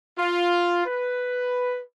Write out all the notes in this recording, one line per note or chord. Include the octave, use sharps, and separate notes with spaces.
F4
B4